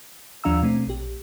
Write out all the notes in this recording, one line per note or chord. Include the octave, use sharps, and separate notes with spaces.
D#2 F3 D4 F5 A#5 E6
B2 A3 C4
A#1 G4